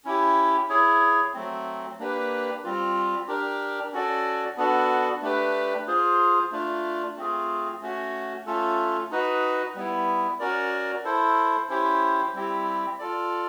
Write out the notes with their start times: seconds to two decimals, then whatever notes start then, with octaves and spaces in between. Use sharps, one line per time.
0.05 C#4 E4 G4
0.69 E4 G#4 C#5
1.34 F#3 A3 C4
1.99 A#3 D4 G4 B4
2.64 G3 C4 F4
3.28 D4 G4 A#4
3.93 C#4 F#4 A4 D5
4.57 B3 D4 F#4 A4
5.22 A3 D4 G4 B4
5.87 F4 G#4 C5
6.51 A3 D4 F4
7.16 A3 C4 F4 G#4
7.82 A3 C#4 F#4
8.46 A3 C#4 F4 A4
9.11 D#4 F#4 B4 D#5
9.75 G3 B3 E4
10.39 C#4 F#4 A#4 D5
11.05 E4 A4 C5
11.69 C#4 E4 G4 C5
12.34 G3 C4 E4 G4
12.99 F4 A4 D5